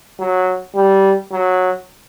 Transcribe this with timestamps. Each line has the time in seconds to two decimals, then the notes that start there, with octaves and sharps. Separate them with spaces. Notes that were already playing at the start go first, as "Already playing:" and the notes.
0.20 F#3
0.75 G3
1.32 F#3